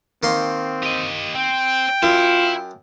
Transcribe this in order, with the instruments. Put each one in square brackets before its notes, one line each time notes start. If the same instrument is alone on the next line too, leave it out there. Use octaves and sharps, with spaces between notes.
[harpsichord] D#3 A#3 C6 [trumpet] C4
[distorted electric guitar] G4 D#5
[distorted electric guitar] C4 [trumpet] G5
[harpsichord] F#2 [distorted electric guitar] E4 [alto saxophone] F4